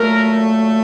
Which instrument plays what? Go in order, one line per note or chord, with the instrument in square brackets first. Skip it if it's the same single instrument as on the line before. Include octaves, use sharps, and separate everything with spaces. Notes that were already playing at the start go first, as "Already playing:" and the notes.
Already playing: [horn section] A#2 F#3 A3 A#4